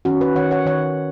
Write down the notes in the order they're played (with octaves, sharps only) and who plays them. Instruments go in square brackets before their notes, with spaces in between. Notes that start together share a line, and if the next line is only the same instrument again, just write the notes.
[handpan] D#3 C#4 F#4
F#4 B4
D#3 C#5 F#5
C#5 F#5
D#3 C#5 F#5